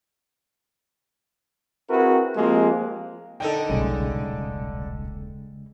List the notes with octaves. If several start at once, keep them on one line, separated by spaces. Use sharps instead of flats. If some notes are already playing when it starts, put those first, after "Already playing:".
C4 E4 F#4 G#4 A#4 B4
F3 G#3 A#3 C4 F4 G4
D3 D#4 A4 G5
D#1 B1 C#3 G#3